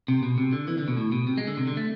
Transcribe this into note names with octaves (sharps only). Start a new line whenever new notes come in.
C3
B2
C3
D3
E3
D3
B2
A2
B2
C3
G#3
D3
C3
D3
A3